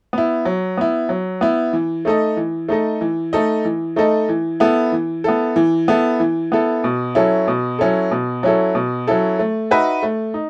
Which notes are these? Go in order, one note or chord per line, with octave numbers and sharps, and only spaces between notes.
B3 E4
F#3
B3 E4
F#3
B3 E4
E3
A3 D#4 A4 D#5
E3
A3 D#4 A4 D#5
E3
A3 D#4 A4 D#5
E3
A3 D#4 A4 D#5
E3
B3 E4 A4
E3
B3 E4 A4
E3
B3 E4 A4
E3
B3 E4 A4
B2
F#3 C#4 E4 A4
B2
F#3 C#4 E4 A4
B2
F#3 C#4 E4 A4
B2
F#3 C#4 E4 A4
A3
D#4 F#4 B4 E5
A3
D#4